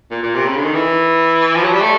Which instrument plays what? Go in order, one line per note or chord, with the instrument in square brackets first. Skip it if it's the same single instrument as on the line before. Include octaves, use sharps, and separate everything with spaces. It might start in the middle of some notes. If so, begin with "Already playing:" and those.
[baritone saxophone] A#2
A#2
C3
C#3
D3
D#3
E3
F3
F#3
G3
A3